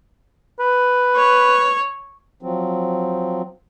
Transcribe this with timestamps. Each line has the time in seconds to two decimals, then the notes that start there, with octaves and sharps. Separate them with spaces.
0.60 B4
1.17 C#5
2.43 F3 F#3 C4